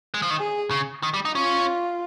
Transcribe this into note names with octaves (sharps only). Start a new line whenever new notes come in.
G#3
F3
D#3
G#4
C#3
D#3
G3
D#4
C#4 F4